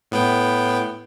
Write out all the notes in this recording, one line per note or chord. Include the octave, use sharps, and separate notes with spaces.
A2 B3 G5